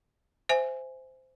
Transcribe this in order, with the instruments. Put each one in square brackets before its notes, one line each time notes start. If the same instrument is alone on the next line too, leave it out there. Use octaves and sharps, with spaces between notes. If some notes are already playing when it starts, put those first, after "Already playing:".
[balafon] C5 E5 G#5